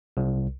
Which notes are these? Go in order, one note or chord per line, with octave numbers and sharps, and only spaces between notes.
C2